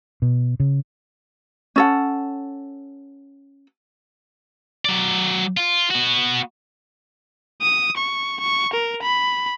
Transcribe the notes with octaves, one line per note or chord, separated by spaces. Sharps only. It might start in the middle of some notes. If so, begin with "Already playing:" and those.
B2
C#3
C#4 A4 F#5
F#3 D5
F4
B3 F#4
D#6
C#6
C#6
A#4
B5